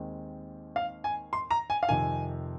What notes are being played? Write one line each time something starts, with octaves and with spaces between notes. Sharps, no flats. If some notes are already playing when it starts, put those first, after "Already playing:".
Already playing: D#2 D#3 G#3 C4
F5
G#5
C6
A#5
G#5
F5
F2 C3 D#3 G#5